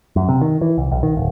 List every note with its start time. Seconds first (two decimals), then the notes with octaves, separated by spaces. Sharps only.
0.16 F#2
0.29 C3
0.42 D#3
0.61 E3
0.78 C2
0.91 B1
1.03 D#3
1.17 D1